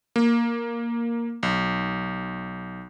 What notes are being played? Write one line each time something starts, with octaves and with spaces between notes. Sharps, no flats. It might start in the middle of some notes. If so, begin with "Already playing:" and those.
A#3
B1